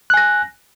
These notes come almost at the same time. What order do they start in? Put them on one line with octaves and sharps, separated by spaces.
F#6 G#5 A#6